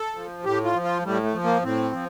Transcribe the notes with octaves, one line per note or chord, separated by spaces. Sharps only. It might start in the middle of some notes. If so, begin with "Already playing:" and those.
Already playing: A4
F3
A2 G4
F4
F3
F4
A2 G3
A3
F3
A#3
A2 C4
F3